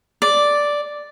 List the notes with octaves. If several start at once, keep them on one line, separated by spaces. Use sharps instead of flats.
D5